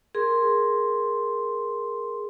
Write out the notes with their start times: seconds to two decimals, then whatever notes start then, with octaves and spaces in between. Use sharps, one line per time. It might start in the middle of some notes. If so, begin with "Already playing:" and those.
0.15 G#4 A#4 C6